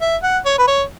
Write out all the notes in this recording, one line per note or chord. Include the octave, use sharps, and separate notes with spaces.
E5
F#5
C#5
B4
C#5